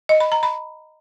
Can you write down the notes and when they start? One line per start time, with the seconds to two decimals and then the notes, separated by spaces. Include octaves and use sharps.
0.09 D#5
0.20 B5
0.32 A#5
0.43 B5